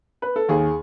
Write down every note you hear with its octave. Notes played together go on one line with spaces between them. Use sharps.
B4
A4
D#2 G#4